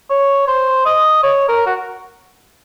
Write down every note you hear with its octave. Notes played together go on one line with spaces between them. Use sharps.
C#5
C5
D#5
C#5
A#4
F#4